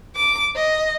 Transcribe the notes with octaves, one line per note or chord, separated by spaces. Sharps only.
D6
D#5